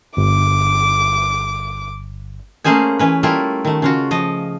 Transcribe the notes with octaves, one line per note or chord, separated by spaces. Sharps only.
G1 D6
A3 A#3 C#4 G#4 C5 G#5
E3 C#4 B4
G3 A3 A#3 E4 F4
D#3 A3
C#3 F4 F#4
F3 D#5